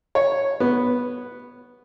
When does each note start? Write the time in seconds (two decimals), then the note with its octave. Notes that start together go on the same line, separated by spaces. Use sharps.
0.15 C#5
0.60 B3